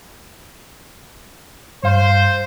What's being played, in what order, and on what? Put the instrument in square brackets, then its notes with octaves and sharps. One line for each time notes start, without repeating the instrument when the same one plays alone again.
[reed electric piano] G2 F5 [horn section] C5